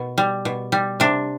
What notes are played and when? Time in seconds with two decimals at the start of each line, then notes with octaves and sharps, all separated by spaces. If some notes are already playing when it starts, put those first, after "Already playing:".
Already playing: B2
0.18 G3
0.45 B2
0.72 G3
1.00 C3 D4